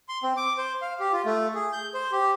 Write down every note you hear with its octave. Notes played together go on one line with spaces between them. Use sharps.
C6
C4
D6
C5
F5
G4
F4
A3
G#4
G6
C5
G4